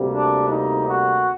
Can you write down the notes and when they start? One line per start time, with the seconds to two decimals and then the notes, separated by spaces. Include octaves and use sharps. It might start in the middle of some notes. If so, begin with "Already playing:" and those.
Already playing: D2 C3 G3 A#3
0.13 D4
0.50 D#4
0.88 F#4